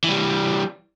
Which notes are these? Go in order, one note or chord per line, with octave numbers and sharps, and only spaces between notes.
E3 G3